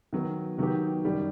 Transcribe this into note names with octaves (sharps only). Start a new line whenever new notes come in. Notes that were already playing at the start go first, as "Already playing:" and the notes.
D#3 F#3 B3
D#3 F#3 B3 D#4 G4
F#2 D#3 G3